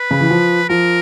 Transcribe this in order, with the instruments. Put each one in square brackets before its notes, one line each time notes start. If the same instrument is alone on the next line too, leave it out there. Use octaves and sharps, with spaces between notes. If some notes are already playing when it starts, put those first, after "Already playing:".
Already playing: [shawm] B4
[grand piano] C#3
E3
F3
[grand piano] F3 [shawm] A#4